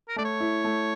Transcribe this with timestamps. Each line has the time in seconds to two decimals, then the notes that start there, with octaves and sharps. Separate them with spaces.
0.09 A#4
0.16 A3 D5
0.25 C#5
0.40 E4
0.64 A3